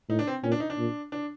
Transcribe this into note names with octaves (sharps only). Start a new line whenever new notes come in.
A2 D#4
D4
C4
A#2 C#4
D4
D#4
D4
A#2
D4